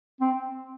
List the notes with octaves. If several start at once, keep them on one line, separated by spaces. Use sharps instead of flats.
C4